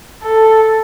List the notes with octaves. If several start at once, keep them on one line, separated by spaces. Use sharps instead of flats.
A4